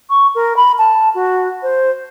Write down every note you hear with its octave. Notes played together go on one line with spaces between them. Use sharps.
C#6
A#4
B5
A5
F#4
C5